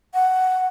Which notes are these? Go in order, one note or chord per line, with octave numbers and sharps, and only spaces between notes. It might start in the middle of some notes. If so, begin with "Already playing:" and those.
F#5